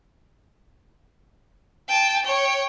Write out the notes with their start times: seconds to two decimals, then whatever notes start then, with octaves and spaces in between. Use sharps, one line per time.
1.89 G5 A5
2.25 C#5 G5